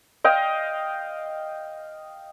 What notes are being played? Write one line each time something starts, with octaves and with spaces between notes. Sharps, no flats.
D#5 F5 G5